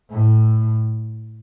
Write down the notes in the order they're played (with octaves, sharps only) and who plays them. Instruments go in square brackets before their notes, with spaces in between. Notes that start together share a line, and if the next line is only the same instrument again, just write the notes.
[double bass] A2